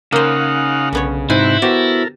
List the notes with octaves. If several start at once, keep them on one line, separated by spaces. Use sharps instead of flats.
C#3 A#3 D#4 C5 F5 F#5
B1 D3 B3 C#5
G#2 C3 C4 D#4 E4 F#4 C5 G#5
B3 F#4 G4 A4 A#4 C5